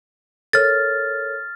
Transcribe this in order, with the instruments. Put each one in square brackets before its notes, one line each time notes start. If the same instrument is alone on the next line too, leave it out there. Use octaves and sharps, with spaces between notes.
[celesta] A4 A#4 C#5 [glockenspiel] F6 A6